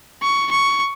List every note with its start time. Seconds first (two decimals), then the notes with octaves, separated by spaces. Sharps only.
0.22 C#6
0.51 C#6